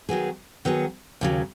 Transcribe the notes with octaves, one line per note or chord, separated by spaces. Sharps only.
D#3 F#3 B3 G#4
D#3 F#3 B3 G#4
D#2 C#3 F#3